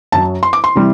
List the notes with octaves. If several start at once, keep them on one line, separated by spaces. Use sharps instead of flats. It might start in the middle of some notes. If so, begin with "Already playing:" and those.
F#2 F#3 A5
C6
D6
C6
C3 E3 G3